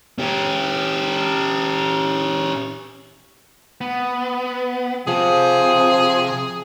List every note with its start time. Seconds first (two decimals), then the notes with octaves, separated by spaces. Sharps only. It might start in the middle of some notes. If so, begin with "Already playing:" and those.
0.18 C#4 G4
3.81 B3
5.07 C3 F3 G#4